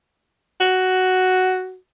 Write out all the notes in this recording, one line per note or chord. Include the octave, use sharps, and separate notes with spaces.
F#4